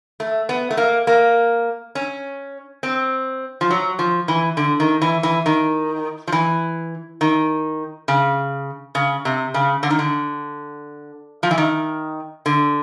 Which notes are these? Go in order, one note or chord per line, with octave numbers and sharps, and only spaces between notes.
A3
B3
A3
A#3
A#3
C#4
C4
F3
F#3
F3
E3
D3
D#3
E3
E3
D#3
F3
E3
D#3
C#3
C#3
C3
C#3
D3
D#3
D3
F3
E3
D#3
D3